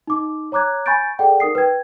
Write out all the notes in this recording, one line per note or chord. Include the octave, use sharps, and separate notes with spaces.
D#4 D6
C#5 A#5 D6 F#6 G#6
G#5 B5 C#6 G6 A6 D7
G#4 A4 D5 F#5 G5
D#4 A#4 D#6 C7
B4 G5 G#6